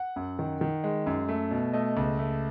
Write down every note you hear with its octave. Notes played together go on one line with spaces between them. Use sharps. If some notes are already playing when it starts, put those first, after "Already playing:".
Already playing: F#5
F#2
D#3
D#3
G#3
F#2
A3
B2
A3 D#5
C#2
A3